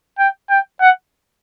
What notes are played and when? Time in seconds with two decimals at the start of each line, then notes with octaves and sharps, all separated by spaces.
0.19 G5
0.50 G5
0.81 F#5